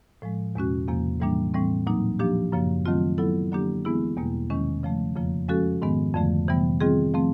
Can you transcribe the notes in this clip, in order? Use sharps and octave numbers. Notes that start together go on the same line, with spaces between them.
A2 F3 G#3
E2 B2 G#3 C#4 F#4
E2 C3 F3 A#3
A2 E3 G3 A#3 D4
A2 E3 G3 C4
A#2 F#3 A#3 D#4
F3 A#3 D4 G4
F#2 C#3 F3 A#3
D#3 F#3 A3 C4 F4
F#3 B3 E4 A4
D3 F#3 A#3 D4 G4
E3 G#3 B3 E4 G#4
E2 B2 G3 A#3
E2 C3 D#3 G#3 C#4
C#3 F3 A3
F2 C#3 F3 A#3
F3 G#3 C#4 F#4 A4
G#2 D#3 G#3 B3
F2 D3 F3 A3
C3 E3 G3 B3
D#3 G3 C4 F4 G#4
F3 A3 C4